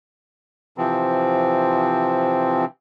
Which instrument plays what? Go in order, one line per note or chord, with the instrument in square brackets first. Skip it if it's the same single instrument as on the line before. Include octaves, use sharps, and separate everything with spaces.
[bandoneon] C3 E3 F3 C4